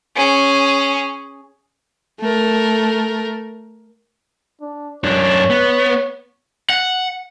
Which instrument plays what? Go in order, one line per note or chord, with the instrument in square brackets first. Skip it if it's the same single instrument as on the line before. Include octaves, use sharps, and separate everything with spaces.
[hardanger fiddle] C#4 G#4
[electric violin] A3 A#4
[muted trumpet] D4
[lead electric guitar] F#2 D4 [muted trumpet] C#5
[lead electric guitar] B3
[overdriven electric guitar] F#5